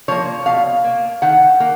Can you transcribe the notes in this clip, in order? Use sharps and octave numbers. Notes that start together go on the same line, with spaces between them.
F3 A#3 C#5
B2 F5
A#3
D#3 F#5
A#3